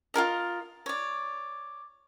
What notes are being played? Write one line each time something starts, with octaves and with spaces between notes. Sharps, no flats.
F4 G#4 A#4 D#5
C#5 D5